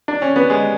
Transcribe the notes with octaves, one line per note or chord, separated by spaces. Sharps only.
D4
C#4
B3
G#3